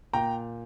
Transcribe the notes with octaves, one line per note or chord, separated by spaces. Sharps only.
A#2 G5 A#5